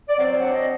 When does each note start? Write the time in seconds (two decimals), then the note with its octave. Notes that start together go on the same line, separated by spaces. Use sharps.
0.09 D5
0.19 F#3 C4 C5
0.39 D4 F#5
0.52 D#5